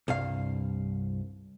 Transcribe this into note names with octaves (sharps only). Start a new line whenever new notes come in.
C2 G2 F5